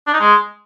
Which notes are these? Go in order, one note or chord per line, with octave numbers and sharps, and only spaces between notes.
D4
D#4
G#3